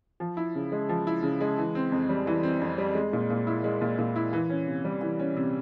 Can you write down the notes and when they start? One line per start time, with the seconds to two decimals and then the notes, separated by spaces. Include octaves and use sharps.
0.20 F3
0.37 E4
0.55 C#3
0.72 G#3
0.89 F3
1.07 E4
1.23 C#3
1.41 G#3
1.58 E3
1.75 C4
1.92 F2
2.09 G3
2.27 E3
2.43 C4
2.61 F2
2.78 G3
2.95 G#3
3.13 A#2
3.30 A#2
3.47 E4
3.64 G#3
3.82 A#2
3.99 A#2
4.16 E4
4.33 E3
4.50 C#4
4.67 C3
4.85 G3
5.01 E3
5.19 C#4
5.36 C3